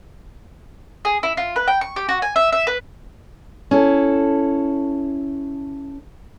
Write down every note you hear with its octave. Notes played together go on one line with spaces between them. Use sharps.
G#4
E4
F4
B4
G5
C#6
G4
F#4
G#5
E5
E5
B4
C#4 E4 A4